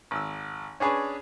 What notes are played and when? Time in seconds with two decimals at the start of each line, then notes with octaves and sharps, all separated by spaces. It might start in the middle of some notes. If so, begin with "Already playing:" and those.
0.11 G#1 E6
0.80 C#4 D4 G#4 B4 C#5